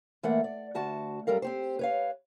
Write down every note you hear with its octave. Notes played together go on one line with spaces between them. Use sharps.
E3 A3 A#3 D5 F#5
D5
D2 F#4 A5
F#2 G3 A4 A#4 F5
C4 G4 C5
B4 C#5 F5